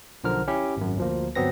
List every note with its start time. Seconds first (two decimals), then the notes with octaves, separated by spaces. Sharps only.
0.24 B1 D3 F3 A#4 F6
0.48 C#4 E4 G4
0.77 G#1 F#2
0.97 D2 F3 A#3
1.35 G1 F#3 B3 C4 A#6